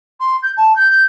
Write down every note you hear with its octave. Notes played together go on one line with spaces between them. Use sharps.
C6
G6
A5
G6